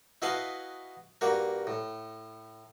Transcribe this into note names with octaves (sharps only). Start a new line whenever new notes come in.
E4 F#4 B4 D#5 F5 A5
G2 A#3 F#4 A#4
A2